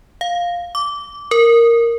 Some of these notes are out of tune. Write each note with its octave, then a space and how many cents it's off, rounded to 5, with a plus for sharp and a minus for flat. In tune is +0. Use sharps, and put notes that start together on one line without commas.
F5 +5
D6 -20
A#4 -5